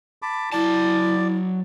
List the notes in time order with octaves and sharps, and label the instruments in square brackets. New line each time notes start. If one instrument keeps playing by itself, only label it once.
[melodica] A5 B5 D6
[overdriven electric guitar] F#3 A5 [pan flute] E4 [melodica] D5